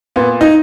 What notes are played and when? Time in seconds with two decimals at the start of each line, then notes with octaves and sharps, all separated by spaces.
0.16 A#2 B3
0.41 D#4